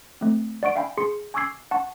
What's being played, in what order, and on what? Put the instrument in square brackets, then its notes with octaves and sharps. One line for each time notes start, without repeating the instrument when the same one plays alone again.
[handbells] A3 C4
D5 F#5 C#6 D7
E5 F5 G5 G#5 B5
G#4 C6 C#7
G#5 C#6 D6 E6 G#6 C7
F#5 A5 C#6